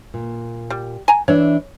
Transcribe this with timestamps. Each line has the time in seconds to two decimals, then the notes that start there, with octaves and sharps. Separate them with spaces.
0.14 A#2
0.70 G3
1.08 G#5 A#5
1.28 E3 D4 C#5 E5